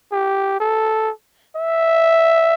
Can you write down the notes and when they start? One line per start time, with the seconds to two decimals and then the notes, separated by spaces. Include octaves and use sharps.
0.12 G4
0.60 A4
1.56 E5